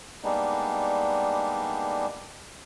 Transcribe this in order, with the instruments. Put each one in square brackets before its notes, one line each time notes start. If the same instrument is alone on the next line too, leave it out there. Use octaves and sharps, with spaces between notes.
[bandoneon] G3 G#3 A#3 B3 D4 D#4